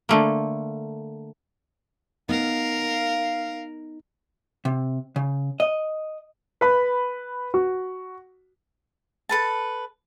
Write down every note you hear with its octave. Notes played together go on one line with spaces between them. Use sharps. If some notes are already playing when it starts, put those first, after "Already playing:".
D3 A3 A#3
B3 D#4 A#4 F5
C3
C#3
D#5
B4 B5
F#4
A4 B4 A5